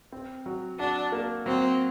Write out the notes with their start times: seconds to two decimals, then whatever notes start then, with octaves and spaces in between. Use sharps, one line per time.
0.12 C4
0.46 F#3
0.79 D4 F#4
1.12 A#3
1.46 F#3 C4